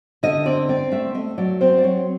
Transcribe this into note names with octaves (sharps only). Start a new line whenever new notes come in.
D3 D#5
C4 D5
C4 D5
A3 E5
A3 D#5
F#3 D5
C4 C5
D5
F#3 C#5